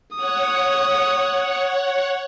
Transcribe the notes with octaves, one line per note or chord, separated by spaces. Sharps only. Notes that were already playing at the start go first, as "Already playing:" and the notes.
C#5 F#5 D#6